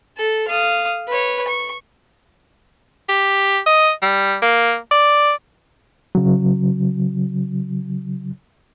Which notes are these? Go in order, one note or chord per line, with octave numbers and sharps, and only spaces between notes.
A4
F5 D#6
B4 C#5
C#6
G4
D#5
G3
A#3
D5
C#3 F#3